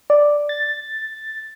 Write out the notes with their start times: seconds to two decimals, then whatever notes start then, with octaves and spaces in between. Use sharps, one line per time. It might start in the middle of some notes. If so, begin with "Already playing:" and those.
0.10 D5
0.49 A6